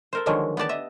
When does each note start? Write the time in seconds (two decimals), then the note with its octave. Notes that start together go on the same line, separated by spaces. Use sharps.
0.13 A4 A#4 C5
0.26 D3 D#3 F3 F#3 G#3 A#3
0.57 B3 G4 D5 A5
0.69 D#5 E5